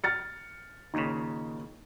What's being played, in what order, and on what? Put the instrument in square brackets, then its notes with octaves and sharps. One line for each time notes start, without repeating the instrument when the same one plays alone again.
[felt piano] F6 A6 C#7
[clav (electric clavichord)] D#2 A#2 C#3 [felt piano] D#4